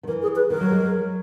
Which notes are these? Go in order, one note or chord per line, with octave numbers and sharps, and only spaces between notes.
D#3
E3 A#4
G#4
B4
D#3 A#4
F#3
G#3
F#3